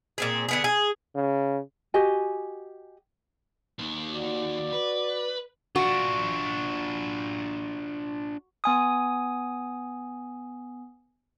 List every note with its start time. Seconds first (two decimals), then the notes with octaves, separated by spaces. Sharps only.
0.18 A#2 C4 G#4
0.49 D3 B3 G#4
0.64 G#4
1.15 C#3
1.94 F#4 G4 D#5 G#5
3.79 D#2 D#3
4.11 F#4 D5
4.72 B4
5.76 D4 F4 F#4
8.64 B3 G#5 D#6